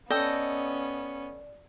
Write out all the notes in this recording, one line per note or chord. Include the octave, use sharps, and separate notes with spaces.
B3 C#4 A4 D5 D#5 G5